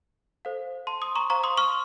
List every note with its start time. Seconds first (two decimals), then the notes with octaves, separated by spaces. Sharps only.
0.45 A4 C5 F5
0.87 A5 C6
1.01 C6 D#6
1.15 A#5 C#6
1.30 C5 F5 A#5 C#6
1.43 C6 D#6
1.58 C#6 F6